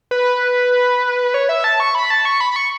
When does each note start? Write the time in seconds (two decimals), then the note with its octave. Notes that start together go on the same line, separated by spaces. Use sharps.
0.11 B4
1.34 C#5
1.49 E5
1.64 A5
1.80 C#6
1.95 B5
2.10 A5
2.25 C#6
2.41 B5
2.56 C#6